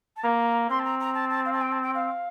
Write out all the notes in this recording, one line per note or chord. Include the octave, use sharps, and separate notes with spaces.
A5
A#3 A#5
C4 C6
A5
A#5
A#5
A5
A5
F5
A5
G5
A5
G5
F5